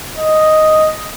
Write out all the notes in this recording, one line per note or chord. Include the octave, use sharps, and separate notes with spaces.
D#5